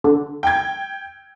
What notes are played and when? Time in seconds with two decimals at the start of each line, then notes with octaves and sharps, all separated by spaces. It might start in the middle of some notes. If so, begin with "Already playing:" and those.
0.04 D3
0.43 G5 G#6